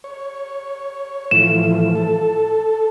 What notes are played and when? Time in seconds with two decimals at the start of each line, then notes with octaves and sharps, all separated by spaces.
0.04 C#5
1.31 A2 E3 F3 E7
1.95 A4